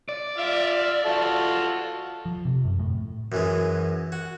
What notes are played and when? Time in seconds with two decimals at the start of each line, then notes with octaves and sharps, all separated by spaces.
0.09 D5
0.38 F4 E5 F5
1.06 F4 F#4 A4
2.26 F3
2.45 C3
2.65 F#2
2.79 A2
3.32 F#2 E3 G#3
4.12 F#4